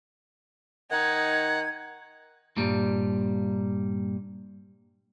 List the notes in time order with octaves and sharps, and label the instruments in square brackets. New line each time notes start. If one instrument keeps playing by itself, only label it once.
[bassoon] D#3 [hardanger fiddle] D#4 [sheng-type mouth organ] F#5 [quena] G#6
[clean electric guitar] G2 A#2 G3